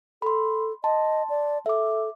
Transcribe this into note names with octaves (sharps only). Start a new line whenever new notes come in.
A4 B5 C6
D#5 A5 C6
D5
A4 E5 D6